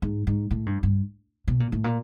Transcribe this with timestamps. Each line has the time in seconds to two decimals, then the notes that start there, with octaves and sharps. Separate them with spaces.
0.02 G#2
0.27 G#2
0.51 A2
0.66 G2
0.83 G2
1.48 B2
1.60 A#2
1.72 A2
1.84 A#2